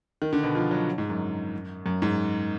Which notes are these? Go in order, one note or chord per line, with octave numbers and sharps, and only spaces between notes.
D#3
D3
B2
F3
F#3
G#2
F#2
F#2
G#2